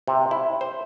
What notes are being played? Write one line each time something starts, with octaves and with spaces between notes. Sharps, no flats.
C3
E4
C5